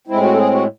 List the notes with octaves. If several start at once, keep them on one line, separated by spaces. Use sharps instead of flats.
A2 G#3 C4 E4
F#4
A4
G#4
F#4